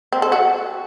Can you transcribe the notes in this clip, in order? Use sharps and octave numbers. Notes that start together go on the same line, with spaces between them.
C4
A4
F#4